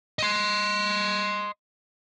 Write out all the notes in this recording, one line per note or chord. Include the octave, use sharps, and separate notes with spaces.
D#5 C6